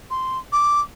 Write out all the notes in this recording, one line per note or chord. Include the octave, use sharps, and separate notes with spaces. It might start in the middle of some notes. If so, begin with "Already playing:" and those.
C6
D6